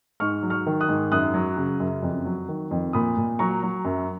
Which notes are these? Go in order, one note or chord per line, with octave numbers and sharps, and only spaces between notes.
G#2 C#6 F6
F#3
C#6 F6
D#3
D#6 F#6
G#2
F#2 D#6 F#6
F#3
C#3
F#2
F2
F#3
D#3
F2
A#2 B5 D#6
A#2
F#3 A#5 C#6
F#3
F#2